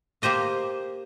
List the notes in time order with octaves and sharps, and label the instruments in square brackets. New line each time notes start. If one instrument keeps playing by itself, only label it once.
[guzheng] A#3 G4 C5 D#5 F5